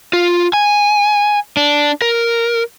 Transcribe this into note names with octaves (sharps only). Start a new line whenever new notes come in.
F4
G#5
D4
A#4